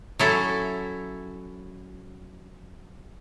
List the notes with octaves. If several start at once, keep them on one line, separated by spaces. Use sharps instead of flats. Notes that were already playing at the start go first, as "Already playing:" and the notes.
F#3 C#4 E4 A4